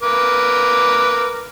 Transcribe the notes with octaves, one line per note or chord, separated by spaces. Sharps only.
A#4 B4 D6